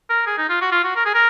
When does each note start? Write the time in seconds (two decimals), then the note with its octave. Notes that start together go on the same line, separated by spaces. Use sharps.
0.10 A#4
0.26 G#4
0.38 D#4
0.49 F4
0.61 F#4
0.72 F4
0.84 F#4
0.96 A#4
1.05 G#4
1.14 A#4